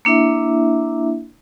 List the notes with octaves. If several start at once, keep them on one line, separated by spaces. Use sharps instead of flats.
A#3 D4 E4 E5